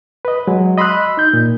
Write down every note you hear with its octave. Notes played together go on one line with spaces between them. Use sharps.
B4 D#5
F#3 G#3
D#5 B5 C6 E6 F#6
D#4 G6
A#2